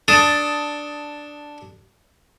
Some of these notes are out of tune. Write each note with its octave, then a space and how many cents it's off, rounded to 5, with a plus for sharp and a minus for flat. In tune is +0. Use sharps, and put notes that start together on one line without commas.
D4 +0 A4 +0 D#6 +10